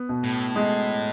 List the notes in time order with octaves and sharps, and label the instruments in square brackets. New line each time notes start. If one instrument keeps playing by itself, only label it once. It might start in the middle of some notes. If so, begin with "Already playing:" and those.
Already playing: [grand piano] B3
B2
[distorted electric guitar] A2
[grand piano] G#3